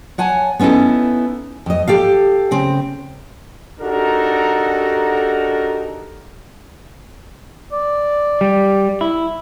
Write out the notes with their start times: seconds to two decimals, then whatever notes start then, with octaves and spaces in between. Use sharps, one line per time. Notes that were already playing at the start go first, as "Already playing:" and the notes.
0.18 C#5 F#5 G#5 A5
0.59 B3 C#4 D#4 E4 A4
1.66 F2 D#5
1.88 G4 A4 F5
2.51 C#3 C4
3.81 D4 D#4 F#4 G4 A4 A#4
7.72 D5
8.41 G3
9.01 E4